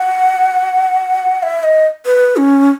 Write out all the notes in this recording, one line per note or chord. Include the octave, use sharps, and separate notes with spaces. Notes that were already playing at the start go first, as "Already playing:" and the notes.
Already playing: F#5
E5
D#5
B4
C#4